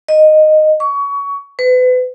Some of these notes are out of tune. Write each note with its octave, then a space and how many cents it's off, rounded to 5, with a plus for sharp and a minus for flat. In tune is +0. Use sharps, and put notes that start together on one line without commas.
D#5 -10
C#6 +25
B4 +35